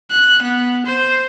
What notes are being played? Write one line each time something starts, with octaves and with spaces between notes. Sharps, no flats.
F#6
B3
C5